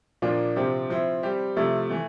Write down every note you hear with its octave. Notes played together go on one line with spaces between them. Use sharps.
A#2 F3 A#3 D4 F4
C3 F3 C4 G4
F3 C4 E4
G3 C4 G4
C3 F3 A3 E4 A4
E3 A3